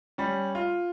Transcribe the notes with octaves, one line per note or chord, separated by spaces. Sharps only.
G3 C#4
F4